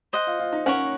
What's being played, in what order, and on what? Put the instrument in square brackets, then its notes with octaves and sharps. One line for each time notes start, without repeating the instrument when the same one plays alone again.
[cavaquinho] C5 D#5 F#5
[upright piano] F4
F4
D#4
[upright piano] C#4 [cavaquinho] A#4 C#5 F#5